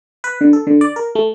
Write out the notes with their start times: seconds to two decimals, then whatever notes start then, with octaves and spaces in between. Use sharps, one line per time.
0.24 B4
0.41 D3
0.53 A4
0.67 D3
0.81 D5
0.96 A#4
1.15 A3